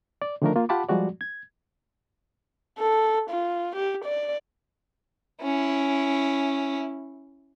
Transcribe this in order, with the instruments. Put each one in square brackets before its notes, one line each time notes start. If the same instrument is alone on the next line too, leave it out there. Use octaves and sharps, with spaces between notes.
[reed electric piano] D5
D3 D#3 F3 A3 D4 A#4
A#3 F4
F4 G4 F#5 A5 B5 D6
F3 G3 G#3 F#4 D5
G#6
[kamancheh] A4
F4
G4
D5
[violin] C#4 E4